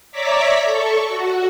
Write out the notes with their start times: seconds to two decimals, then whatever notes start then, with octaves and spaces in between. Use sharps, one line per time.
0.12 C#5 D5 E5 A#5 D6 B6
0.64 A4 C#6
1.08 F#4